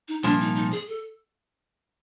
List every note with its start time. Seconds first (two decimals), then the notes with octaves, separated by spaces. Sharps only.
0.08 D#4
0.24 C2 A#2 F3 A#3 D4
0.41 D#4
0.56 D#4
0.72 G#4
0.88 A4